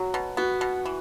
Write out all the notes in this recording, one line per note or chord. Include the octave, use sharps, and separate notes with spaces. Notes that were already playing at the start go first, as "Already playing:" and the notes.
Already playing: F#3 F#4
B2
B3 F#4
B2
E3